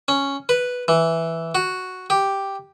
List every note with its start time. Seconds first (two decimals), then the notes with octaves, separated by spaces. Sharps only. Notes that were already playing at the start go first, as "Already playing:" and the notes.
0.08 C#4
0.49 B4
0.88 E3
1.55 F#4
2.10 G4